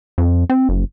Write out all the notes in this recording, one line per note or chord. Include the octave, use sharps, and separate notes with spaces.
F2
C4
F#1